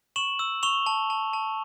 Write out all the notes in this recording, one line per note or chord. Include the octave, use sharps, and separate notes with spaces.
C#6 E7 F#7
E6
C#6 F7 G7
A5
A5
A5